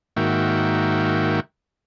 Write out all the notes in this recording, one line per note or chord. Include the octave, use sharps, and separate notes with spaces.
G#2 D#3 A#3 F#4 E5 G5